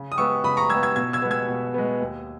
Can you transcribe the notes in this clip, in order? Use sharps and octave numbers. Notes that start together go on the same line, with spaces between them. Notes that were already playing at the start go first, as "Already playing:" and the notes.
Already playing: C#3
D#6
G#3 B3 C#6 E6
C#3 B5 D#6
A#5 C#6
G#3 B3 E6 G#6
E6 G#6
B2 E6 G#6
E6 G#6
G#3 B3
E6 G#6
B2
G#3 B3
D#2